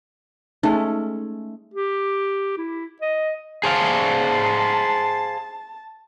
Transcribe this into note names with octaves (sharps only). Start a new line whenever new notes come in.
G#3 A3 C#4 D#4
G4
E4
D#5
G#4 C5 F5 A5